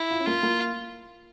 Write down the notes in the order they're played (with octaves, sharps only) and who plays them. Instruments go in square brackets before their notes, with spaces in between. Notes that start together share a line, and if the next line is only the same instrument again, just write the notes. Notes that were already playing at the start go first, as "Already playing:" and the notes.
Already playing: [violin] E4
[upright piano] F4
C#4
[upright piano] A#3 [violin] F4
[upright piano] A#3